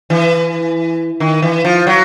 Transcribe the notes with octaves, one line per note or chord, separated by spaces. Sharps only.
E3
D#3
E3
F3
F#3